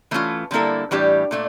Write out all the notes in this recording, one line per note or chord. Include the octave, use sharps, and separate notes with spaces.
E3 A3 C#4 F4
D3 G3 A#3 E4 A4
A2 E3 G3 D4 G4
A#2 A3 D4